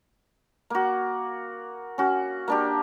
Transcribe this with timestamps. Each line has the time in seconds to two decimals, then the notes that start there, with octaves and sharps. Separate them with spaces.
0.70 A#3 F#4
1.98 C#4 F#4
2.48 A#3 D4 G4